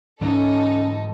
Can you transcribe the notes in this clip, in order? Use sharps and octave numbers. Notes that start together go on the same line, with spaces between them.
G#2 E3 G#3 C#4 D#4 A4